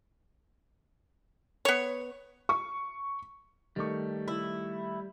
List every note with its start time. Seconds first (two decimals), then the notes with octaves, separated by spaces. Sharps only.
1.65 B3 C#5
2.49 C#6
3.76 D#3 G3 A3 C#6
4.28 E4